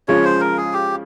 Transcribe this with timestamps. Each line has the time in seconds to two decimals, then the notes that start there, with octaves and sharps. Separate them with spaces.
0.08 C#3 F3 G#3 C#4 F4 C#5
0.24 C5
0.41 A#4
0.57 G#4
0.73 G4